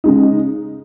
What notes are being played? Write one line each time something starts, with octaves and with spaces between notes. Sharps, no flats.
C#3 G#3 D#4